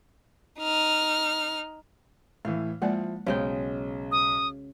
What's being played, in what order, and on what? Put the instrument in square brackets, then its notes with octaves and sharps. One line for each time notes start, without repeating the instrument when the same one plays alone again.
[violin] D#4 F6
[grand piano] A2 E3 [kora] F5
[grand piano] F3 E4 [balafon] G#3 A#3 D5 [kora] F#5
[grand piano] B1 [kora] C#3 G#3 G5 [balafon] C5
[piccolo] D#6